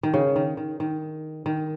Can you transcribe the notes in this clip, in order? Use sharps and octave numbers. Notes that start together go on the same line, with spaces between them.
D#3
C#3
D#3
D#3
D#3
D#3